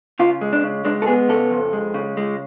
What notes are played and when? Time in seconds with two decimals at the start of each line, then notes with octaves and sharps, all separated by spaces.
0.19 C#3 F4
0.41 G#3
0.53 D4
0.63 C#3
0.85 G#3 D4
1.02 A4
1.06 B3 G#4
1.29 C#3 A4
1.51 F2
1.73 G#3
1.94 C#3
2.17 G#3